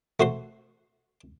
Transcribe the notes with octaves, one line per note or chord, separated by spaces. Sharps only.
A3 F#4 C5 C6